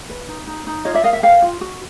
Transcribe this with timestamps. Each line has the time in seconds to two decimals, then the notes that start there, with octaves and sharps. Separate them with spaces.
0.09 B4
0.28 D#4
0.47 D#4
0.67 D#4
0.85 F4 C#5 D#5
0.94 D5 E5
1.04 A#4 D#5 F5
1.13 E5 F#5
1.23 A#4 F5 G5
1.42 F4
1.61 F#4